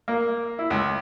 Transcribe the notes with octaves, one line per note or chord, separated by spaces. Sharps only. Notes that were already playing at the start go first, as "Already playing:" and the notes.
A#3
E4
C#2